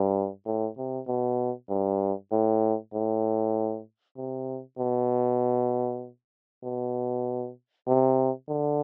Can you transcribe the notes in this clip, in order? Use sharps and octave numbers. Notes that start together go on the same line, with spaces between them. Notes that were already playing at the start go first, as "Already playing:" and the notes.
Already playing: G2
A2
C3
B2
G2
A2
A2
C3
B2
B2
C3
D3